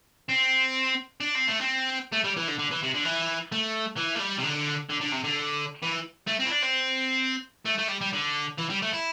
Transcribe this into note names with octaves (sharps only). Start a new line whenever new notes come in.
C4
D4
C4
A3
C4
A3
G3
E3
D3
D3
E3
C3
D3
E3
A3
E3
A3
G3
C3
D3
D3
D3
C3
D3
E3
A3
C4
E4
D4
C4
A3
A3
G3
G3
D3
E3
G3
A3
E4